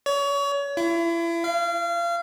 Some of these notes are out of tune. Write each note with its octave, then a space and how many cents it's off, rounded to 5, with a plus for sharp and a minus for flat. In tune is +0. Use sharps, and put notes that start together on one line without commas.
C#5 +30
E4 +35
F5 -30